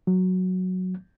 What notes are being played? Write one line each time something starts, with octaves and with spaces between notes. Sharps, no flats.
F#3